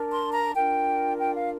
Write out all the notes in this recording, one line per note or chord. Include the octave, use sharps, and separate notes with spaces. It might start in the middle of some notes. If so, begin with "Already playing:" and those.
Already playing: D4 A#4
C6
A#5
D4 F4 A#4 G5
G5
F5